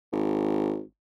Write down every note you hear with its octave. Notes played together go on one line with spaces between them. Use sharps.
G#1